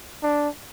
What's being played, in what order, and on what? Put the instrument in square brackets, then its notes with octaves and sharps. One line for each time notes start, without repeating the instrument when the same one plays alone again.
[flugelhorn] D4